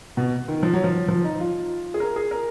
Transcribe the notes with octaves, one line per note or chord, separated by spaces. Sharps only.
B2
D#3
F3
F#3
F3
F3
D#4
F4
G#4
A#4
G#4
A#4